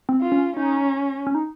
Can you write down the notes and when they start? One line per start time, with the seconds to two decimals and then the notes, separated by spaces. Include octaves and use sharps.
0.09 C4
0.21 F4
0.32 C#4
0.56 C#4 D#4
1.27 C#4
1.35 D#4